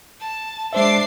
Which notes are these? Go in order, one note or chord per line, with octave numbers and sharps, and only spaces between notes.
A5
G#3 D4 C5 E5 C7